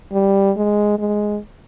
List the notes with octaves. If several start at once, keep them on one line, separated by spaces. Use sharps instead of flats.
G3
G#3
G#3